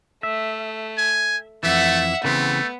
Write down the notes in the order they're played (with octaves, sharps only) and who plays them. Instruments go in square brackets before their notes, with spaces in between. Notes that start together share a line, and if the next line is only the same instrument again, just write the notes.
[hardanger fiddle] A3 [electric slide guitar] E5
[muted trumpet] G#5
[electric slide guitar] F2 E3 [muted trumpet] A3 [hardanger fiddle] E5 F#5
[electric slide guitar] C#3 E3 C4 [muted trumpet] A3 [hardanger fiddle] B3